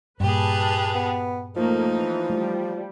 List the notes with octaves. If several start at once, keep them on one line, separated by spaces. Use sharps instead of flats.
G2 A#2 G4 G#4 B4 A5
B3
F3 A3 A#3 D#4
E3
G3 A3